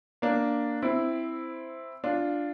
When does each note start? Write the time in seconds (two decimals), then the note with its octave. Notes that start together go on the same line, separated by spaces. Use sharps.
0.22 A#3 D4
0.82 C4 E4
2.04 D4 F4